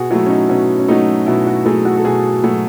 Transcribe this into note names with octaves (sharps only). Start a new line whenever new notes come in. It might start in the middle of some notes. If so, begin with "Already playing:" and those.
Already playing: B2 F#4 G#4
F#3 A3 E4
C#4
D#4
B2 C#4
C#4
F#3 A3 D#4
B2 E4
F#4
F#3 A3 G#4
F#4
A4
B2 G#4
F#3 A3